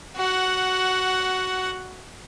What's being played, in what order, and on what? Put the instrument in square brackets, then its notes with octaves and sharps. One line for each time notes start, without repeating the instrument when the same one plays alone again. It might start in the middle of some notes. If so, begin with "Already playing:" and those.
[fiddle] F#4 F#5